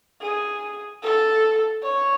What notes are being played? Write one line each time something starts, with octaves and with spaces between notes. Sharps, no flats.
G#4
A4
C#5